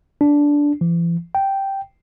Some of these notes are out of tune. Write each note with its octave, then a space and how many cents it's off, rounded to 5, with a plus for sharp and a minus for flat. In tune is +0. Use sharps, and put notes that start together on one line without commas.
D4 -10
E3 +45
G5 -5